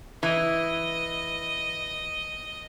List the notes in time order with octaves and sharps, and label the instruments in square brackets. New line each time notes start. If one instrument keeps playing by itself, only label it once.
[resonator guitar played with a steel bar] E3 [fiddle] D#5